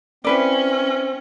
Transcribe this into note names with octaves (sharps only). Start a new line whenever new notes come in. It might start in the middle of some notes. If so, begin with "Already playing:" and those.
C4 C#4 E4 B4 D5